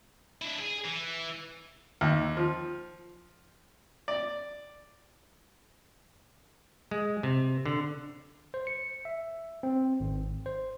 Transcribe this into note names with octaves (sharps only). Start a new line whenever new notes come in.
D4 E4
G#4
E3
D#2
F3
D5
G#3
C3
D3
C5
C#7
E5
C4
G#1
C5